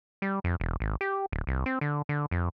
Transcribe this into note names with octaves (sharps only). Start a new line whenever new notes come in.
G3
F2
E1
G#1
G4
D1
C2
C4
D3
D3
F2